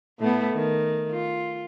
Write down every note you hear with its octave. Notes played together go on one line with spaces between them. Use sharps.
A2 A3 B3
D#3
F4